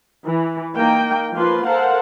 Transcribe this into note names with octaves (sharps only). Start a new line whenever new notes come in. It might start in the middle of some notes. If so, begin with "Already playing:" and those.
E3
A#3 D#4 G5
F3 A#3 F4 B4 C6
A4 A#4 C5 F5 F#5